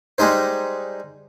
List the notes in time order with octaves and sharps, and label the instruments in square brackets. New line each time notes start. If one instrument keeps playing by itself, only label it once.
[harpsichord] G3 G#3 D#4 C5